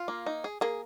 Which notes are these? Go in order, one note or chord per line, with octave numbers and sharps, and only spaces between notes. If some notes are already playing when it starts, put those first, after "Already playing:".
Already playing: F4
A#3
D#4
G#4
A#3 G#4